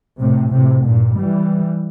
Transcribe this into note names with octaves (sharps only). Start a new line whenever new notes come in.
A2 C3
A2 C3
G2 A#2
E3 G3